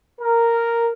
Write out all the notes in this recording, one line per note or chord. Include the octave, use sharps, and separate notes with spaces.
A#4